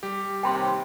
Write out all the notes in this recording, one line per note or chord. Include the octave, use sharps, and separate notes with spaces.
G3 G4
D#2 C3 G5 B5 C6